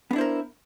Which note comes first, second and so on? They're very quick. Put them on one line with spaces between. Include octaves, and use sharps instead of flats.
B3 D4 E4 C5 A#4